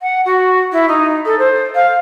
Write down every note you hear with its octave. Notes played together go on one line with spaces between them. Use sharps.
F#5
F#4
E4
D#4
A4
C5
F5